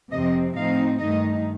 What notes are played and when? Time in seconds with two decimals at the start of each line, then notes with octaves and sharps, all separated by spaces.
0.11 F2 C3 F3 C4 D#5
0.56 A2 F3 C4 D#4 F5
0.99 G2 D#3 A3 D#4 D#5